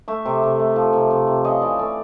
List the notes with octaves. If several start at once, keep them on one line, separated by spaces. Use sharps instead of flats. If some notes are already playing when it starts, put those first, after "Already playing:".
A3 E5
C3
C3
A3
F3
C3
C3
C3
C#3 D#5
E3 D5
A3 D5